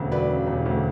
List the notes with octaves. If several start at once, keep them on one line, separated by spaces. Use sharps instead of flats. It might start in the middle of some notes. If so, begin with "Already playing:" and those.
Already playing: E1 D2 C#3 F#3
F#3 B4 D5
C#3
E1
D2